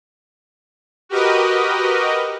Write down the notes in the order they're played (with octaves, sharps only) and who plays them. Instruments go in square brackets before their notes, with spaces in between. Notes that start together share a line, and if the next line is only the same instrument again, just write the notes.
[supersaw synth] F#4 G4 A#4 B4 D#5